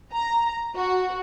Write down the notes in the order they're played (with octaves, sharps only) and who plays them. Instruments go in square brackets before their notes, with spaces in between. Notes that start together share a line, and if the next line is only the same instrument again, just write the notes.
[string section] A#5
F#4